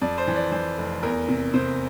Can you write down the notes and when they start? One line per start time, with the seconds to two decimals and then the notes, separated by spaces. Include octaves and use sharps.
0.01 F2 D5
0.18 C5
0.27 E3
0.36 D5
0.52 E3 C5
0.78 F1
1.03 E2 A#4
1.28 C3
1.54 C3 C5